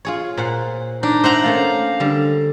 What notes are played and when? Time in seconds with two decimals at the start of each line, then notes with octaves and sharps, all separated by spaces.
0.05 F4 G#4 C#5
0.37 A#2 C5 F#5
1.03 D4 D#4
1.24 C5 E5 F#5 A#5
1.44 A3 A#3 C#4 F5
2.00 D3 G3